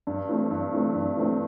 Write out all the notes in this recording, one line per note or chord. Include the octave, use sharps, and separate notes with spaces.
G2
E3 A3 C4
G2
E3 A3 C4
G2
E3 A3 C4